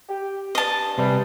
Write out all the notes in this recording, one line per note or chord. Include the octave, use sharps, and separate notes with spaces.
G4
G2 D#5 A5
C3 G3 G#4 B4